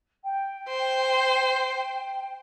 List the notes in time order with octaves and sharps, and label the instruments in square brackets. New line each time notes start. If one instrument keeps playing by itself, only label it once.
[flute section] G5
[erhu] C5